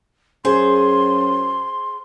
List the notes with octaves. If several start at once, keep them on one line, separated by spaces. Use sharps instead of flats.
F#2 G#4 C5 C6